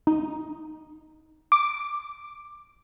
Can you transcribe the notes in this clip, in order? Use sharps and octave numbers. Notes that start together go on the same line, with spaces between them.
D#4
D6